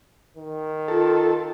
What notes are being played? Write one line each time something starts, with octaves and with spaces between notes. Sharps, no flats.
D#3
F4 A4